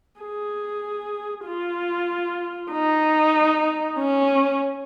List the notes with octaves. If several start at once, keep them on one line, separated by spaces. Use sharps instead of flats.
G#4
F4
D#4
C#4